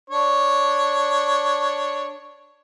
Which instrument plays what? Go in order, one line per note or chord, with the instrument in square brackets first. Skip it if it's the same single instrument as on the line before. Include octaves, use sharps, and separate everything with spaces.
[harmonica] D4 C#5